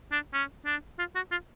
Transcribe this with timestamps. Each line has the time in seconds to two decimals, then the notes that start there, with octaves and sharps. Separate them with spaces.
0.12 D4
0.33 C#4
0.65 D4
0.99 F4
1.15 F#4
1.31 F4